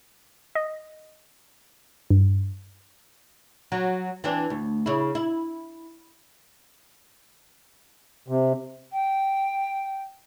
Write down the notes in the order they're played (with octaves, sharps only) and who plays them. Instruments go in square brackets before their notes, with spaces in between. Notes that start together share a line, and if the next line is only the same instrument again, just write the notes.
[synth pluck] D#5
G2
[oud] F#3
E3 C4 D4
D2
C#3 E4
E4
[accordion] C3
[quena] G5